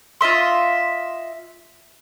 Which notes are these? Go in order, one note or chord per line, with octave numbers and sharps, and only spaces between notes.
F4 D#5 E5 C6